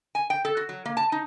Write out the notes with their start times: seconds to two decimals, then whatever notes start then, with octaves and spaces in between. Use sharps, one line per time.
0.15 G#5
0.30 G5
0.45 A4
0.57 F#4
0.69 F#3
0.85 A#3
0.97 A5
1.12 D#4